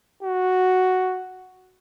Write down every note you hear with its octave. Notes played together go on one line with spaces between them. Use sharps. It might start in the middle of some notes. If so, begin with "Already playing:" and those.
F#4